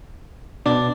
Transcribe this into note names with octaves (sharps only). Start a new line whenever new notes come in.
B2 D4